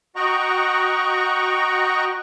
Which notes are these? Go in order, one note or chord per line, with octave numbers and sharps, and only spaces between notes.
F#4 D#5 F#5 G5 A#5 C#6